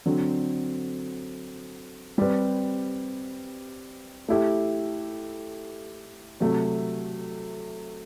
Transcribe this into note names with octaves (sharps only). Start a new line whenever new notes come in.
D3 F#3 C4
G3 C4 G4 B4
A3 E4 G4
C3 F#3 A3